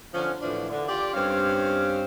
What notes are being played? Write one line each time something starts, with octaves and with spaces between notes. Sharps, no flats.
D3 F3 C#4
A2 D3 E3 F3 D4
D3
F4 G4 D5
G2 G3 C4 C#4 F5